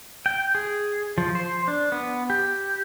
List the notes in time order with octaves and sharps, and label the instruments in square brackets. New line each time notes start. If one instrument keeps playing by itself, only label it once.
[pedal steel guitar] G5
G#4
F3
C5
D4
B3
G4